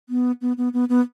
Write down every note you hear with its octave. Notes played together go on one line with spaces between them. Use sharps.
B3
B3
B3
B3
B3